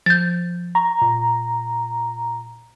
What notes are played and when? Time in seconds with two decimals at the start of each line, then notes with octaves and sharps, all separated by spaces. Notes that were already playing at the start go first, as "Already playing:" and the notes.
0.06 F3 G6 A6
0.75 A#5 C#6
1.01 A#2